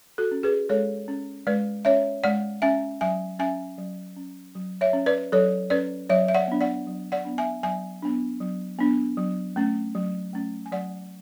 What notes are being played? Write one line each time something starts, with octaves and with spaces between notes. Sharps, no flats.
F#4 A4
C#4
G#4 B4
G#3 A4 C#5
C#4
G#3 B4 D5
C#4 C#5 E5
G#3 D5 F#5
C#4 E5 G#5
F#3 E5 G#5
C#4 E5 G#5
F#3
C#4
F#3
C#5 E5
C#4
B4 D5
F#3 A4 C#5
C#4 B4 D5
F#3 C#5 E5
E5
D5 F#5
B3 D4
D5 F#5
F#3
D5 F#5
B3 D4
E5 G#5
F#3 E5 G#5
B3 D4
F#3
B3 D4
F#3
A3 C#4
F#3
A3 C#4
G#5
F#3 D5 F#5